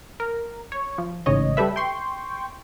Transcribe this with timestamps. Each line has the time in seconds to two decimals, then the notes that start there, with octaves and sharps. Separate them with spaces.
0.20 A#4
0.72 C#5
0.98 F3
1.26 A1 G#2 C#3 C#5 D#5
1.57 G3 G4 A4 B4 E5
1.76 G5 C6 C#6